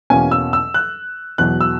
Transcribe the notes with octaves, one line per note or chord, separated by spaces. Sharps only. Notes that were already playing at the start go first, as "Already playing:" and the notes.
E2 B2 A#3 C#4 G#5
E6
E6
F#6
E2 B2 F#3 F#6
E6